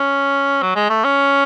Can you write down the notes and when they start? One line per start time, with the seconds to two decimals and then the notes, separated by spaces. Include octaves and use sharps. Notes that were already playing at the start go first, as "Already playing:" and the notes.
Already playing: C#4
0.62 F#3
0.76 G#3
0.90 A3
1.04 C#4